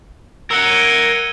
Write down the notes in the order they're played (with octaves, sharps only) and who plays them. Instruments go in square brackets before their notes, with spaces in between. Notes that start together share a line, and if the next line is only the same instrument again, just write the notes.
[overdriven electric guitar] A#4 F#5 [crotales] E6 C#7 G7
[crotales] G#6 D#7
C#7